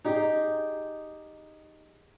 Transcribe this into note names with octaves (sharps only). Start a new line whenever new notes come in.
D#4 G4 G#4